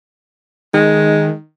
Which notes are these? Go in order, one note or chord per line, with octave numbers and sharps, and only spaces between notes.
D#3 G#3